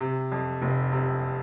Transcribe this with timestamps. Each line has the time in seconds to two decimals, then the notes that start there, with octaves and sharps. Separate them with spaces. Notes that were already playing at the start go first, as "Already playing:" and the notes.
0.01 C3
0.32 F2
0.62 F1
0.92 C3